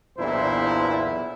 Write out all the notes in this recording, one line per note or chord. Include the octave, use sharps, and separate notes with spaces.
B1 E2 A#2 D4 E4 C5